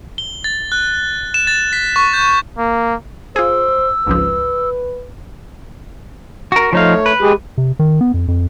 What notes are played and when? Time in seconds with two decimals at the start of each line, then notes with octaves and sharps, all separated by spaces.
0.18 G7
0.44 A6
0.72 F#6
1.34 E7
1.47 A6
1.73 B6
1.96 C#6
2.13 G6
2.58 A#3
3.36 F4 G#4 C5 E6
4.07 G#1 C#2 F3 B4
6.52 F#4 A#4
6.73 F3 A3 D#4 C#5 F5
7.06 B4
7.21 G#3 G4 G#4
7.58 C3
7.79 D#3
8.01 B3
8.14 F2
8.28 F2